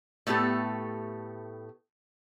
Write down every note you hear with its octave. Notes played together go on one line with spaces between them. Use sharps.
A2 A3 B3 G4 A4